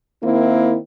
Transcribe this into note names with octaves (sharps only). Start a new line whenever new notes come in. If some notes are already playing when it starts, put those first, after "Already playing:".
D#3 A#3 C4 E4